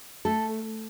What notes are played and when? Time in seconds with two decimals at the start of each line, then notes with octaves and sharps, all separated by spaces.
0.25 A3 A4